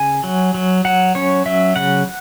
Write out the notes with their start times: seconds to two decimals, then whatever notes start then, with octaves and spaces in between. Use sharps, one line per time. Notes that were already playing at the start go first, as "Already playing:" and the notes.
Already playing: C#3 G#5
0.24 F#3
0.54 F#3
0.85 F#3 F#5
1.15 C#4 C#5
1.46 F#3 E5
1.76 C#3 F#5